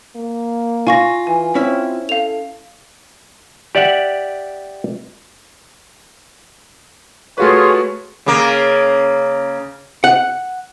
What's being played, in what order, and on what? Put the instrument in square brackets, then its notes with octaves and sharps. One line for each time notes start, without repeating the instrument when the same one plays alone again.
[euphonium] A#3
[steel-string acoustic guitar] F4 [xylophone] G#5 C#6 A#6
[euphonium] E3 [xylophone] G#5
[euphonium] C4 [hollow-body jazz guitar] C#4 E4 E5
[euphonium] A4 [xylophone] F5 F7
[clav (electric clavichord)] G4 D5 E5 F#5
[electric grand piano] A3 F#4 B4 [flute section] F4 G#4 [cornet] C#5
[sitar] C#3 A#3
[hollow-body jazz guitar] F#5